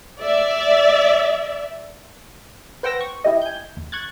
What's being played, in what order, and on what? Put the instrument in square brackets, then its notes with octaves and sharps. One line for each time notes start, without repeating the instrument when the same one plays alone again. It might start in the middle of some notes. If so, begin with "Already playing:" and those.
[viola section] D5 E5
[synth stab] B4 C5 F#5 G5 E6 A#6
C#6
E4 G4 D#5
G#5 G6
D#2
C#6 F#6 G#6 A6